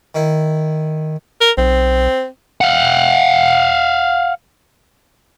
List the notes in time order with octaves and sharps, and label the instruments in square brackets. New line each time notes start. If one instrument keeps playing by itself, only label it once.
[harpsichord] D#3 E4
[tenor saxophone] A#4
[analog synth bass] B1 [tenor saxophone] C4
[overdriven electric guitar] F5 F#5